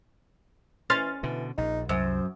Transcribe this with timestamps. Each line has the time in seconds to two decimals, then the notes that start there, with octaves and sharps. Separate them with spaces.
0.90 E3 C#4 C6 F6 A6
1.23 B2 D3 E3
1.58 A#1 D#4
1.89 C2 F#2 C5